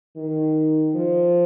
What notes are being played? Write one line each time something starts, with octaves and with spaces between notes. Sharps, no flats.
D#3
F3